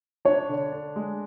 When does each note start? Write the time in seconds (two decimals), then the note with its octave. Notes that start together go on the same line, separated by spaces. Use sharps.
0.25 D4 C#5
0.49 D3
0.72 D4
0.96 G#3